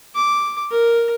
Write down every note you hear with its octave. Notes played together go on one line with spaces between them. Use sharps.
D6
A#4